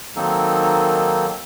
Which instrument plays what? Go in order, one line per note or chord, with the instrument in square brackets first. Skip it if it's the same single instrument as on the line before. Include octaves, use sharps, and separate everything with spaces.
[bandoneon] D#3 F#3 A#3 C4 D#4 A4